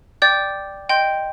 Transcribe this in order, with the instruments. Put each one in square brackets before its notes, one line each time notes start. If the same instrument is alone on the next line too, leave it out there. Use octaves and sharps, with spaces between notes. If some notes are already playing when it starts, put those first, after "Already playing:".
[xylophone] D5 G5 D6 G6
D#5 G5 C6 G6